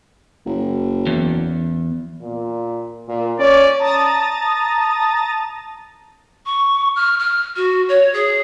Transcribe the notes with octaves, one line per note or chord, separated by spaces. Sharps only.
F#1
E2
A#2
A#2
C#4 D5
A5 A#5 D#6 A6
C#6
F6
F6
F#4
C#5
G#4